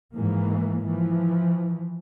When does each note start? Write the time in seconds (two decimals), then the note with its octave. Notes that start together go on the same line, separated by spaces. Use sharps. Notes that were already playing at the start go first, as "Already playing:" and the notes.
0.14 G#2 E3 F3 A#3
0.86 E3 F3